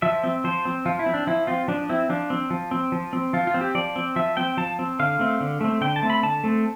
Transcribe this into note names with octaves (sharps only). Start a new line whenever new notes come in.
F3 E5
C4
F3 C5
C4
F3 F4
E4
C4
D4
F3 E4
C4 F4
F3 D4
C4 E4
F3 D4
C4
F3
C4
F3
C4
F3 F4
F4
C4
G4
F3 D5
C4
F3 E5
C4 G5
F3 A5
C4
D3 F5
A3 C4
D3
A3 C4
D3 G5
A5
A3 C4
B5
D3 A5
A3 C4